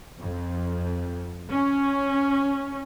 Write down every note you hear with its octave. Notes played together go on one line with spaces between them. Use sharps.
F2
C#4